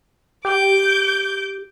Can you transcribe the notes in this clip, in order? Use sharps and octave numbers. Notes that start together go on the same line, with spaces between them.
G4 D6 G6